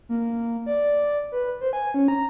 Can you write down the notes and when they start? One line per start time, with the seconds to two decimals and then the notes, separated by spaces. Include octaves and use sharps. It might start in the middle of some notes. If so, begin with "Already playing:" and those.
0.09 A#3
0.66 D5
1.32 B4
1.61 C5
1.73 G#5
1.94 C#4
2.08 A#5